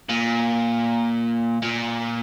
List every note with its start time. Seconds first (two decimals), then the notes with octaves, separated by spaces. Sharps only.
0.09 A#2
1.62 A#2